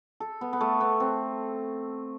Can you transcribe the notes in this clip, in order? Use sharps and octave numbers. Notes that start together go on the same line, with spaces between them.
A4
B3
B3
A3
B3
C4